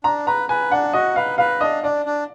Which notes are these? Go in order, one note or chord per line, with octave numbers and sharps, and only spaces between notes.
D4 A#5
B4 A#5
B4 G#5
D4 F#5
F#4 D#5
B4 F5
B4 F5
D4 D#5
D4 D5
D4